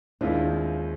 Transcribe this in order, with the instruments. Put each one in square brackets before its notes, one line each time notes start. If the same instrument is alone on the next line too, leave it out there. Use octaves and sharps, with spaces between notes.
[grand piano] D#2 D#3 G#3 C4 F4 [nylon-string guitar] D4 E4